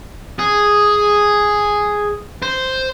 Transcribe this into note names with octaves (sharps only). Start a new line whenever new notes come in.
G#4
C5